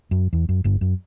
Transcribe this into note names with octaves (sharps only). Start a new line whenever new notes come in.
F#2
E2
F#2
G1 G2
F#2